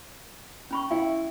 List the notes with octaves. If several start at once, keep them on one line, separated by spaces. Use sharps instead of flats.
C#4 B5 C#6
E4 F5 G5